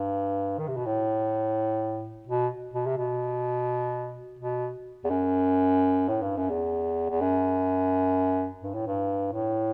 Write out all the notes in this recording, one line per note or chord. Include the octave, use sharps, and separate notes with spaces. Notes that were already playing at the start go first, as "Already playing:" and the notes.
Already playing: G2
D#3
C3
B2
A2
B2
B2
C3
B2
B2
E2
F#2
A2
G2
F#2
E2
E2
F#2
G2
A2
G2
A2